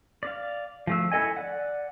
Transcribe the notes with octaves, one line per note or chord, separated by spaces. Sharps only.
D5 F5
F3 A3 E6
E4 A4 D#5 G#5
D5 F#5